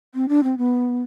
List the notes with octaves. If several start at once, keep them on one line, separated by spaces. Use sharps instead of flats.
C4
D4
C4
B3